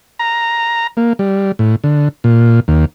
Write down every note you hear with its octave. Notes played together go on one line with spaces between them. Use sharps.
A#5
A#3
G3
A2
D3
A#2
D#2